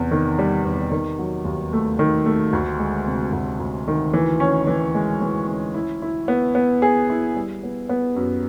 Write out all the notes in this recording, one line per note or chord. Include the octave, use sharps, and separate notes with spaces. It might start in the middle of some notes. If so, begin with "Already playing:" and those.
Already playing: E2 C3
D#3
G3
E2
D#3
F#3
D#2
A3
D#3
A3
D2
G#3
C3
D2
D2
D#3
E3
C#4
E3
G#3
E3
C#4
E4
E4
B3
B3
G#4
E4
G3
B3
B3
F#2